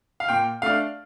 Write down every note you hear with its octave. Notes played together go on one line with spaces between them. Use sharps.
F5
A#2 G5
A3 D4 F5